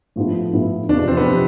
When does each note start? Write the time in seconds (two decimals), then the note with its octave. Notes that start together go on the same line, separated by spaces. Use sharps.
0.16 A2 F3 B3 E4
0.53 A2 F3 B3 E4
0.89 E2 C3 F3 D4
0.99 D4
1.08 C4
1.17 B3
1.26 C3 F3